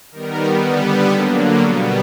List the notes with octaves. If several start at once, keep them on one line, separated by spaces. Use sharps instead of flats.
D#3 G3 B3 A#4
D3 G3 B3
D3 F#3 A#3
B2 G3 B3